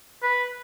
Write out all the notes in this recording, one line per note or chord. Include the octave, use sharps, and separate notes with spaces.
B4